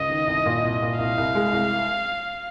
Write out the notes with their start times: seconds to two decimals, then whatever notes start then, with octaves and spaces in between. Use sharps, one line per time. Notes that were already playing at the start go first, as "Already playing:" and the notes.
Already playing: C#2 D#5
0.10 D#3
0.27 C2
0.46 A#2
0.63 C2
0.82 A#2
0.99 C2 F5
1.17 C2
1.35 G#3
1.53 C2